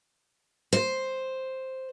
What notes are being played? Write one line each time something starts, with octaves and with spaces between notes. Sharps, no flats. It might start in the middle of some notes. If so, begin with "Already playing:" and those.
C5